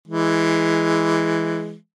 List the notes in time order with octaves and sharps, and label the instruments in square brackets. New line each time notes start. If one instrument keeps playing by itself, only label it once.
[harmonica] E3 G#3